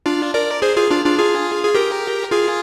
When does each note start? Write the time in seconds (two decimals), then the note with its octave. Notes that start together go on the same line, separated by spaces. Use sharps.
0.06 D4 F4
0.34 A#4 D5
0.62 G#4 C5
0.77 F4 G#4
0.91 D4 F4
1.05 D4 F4
1.18 F4 G#4
1.64 G#4
1.75 G4 A#4
2.31 F4 G#4